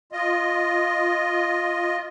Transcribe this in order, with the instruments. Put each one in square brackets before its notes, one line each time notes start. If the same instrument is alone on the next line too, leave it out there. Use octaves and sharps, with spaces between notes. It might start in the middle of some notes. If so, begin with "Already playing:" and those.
[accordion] F4 D#5